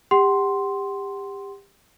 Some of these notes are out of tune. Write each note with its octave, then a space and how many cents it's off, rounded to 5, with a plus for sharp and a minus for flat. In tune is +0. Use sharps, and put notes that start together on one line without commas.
G4 +30 F#5 +35 C6 +0